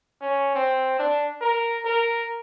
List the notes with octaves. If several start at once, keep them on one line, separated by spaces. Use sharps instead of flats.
C#4
C4
D4
A#4
A#4